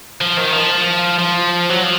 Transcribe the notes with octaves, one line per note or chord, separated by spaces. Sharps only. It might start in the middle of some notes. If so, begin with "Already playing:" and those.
F3
D#3
F3
F3
F#3
F3